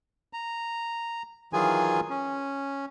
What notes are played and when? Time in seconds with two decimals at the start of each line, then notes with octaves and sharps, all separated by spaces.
0.33 A#5
1.53 D#3 E3 F#3 F4 G#4 G#5
2.10 C#4